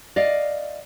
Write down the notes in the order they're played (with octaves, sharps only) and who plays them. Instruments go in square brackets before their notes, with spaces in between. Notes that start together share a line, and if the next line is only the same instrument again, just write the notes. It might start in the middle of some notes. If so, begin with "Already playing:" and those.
[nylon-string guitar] D5 D#5 F5